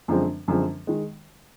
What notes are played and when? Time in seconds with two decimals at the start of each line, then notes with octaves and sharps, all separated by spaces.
0.08 F#2 D3 F3 G#3 C4
0.48 F#2 D3 F3 G#3 C4
0.87 D#3 G#3